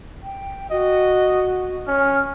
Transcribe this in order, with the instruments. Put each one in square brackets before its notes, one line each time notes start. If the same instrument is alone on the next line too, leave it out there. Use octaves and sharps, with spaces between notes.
[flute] G5
[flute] F#4 [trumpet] D#5
[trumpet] C#4 [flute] F6